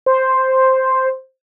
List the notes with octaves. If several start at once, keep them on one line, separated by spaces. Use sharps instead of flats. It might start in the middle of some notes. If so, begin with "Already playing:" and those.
C5